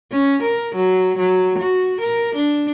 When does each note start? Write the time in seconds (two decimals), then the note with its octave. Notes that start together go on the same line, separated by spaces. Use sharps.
0.12 C#4
0.43 A#4
0.76 F#3
1.18 F#3
1.59 F#4
2.01 A#4
2.36 D4